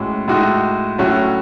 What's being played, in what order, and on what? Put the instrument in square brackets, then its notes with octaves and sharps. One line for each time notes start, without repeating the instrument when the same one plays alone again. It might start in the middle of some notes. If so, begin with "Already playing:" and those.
Already playing: [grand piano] A2 G#3 C#4 F#4
A2 G#3 D#4 F#4
A2 F#3 A3 C#4 F#4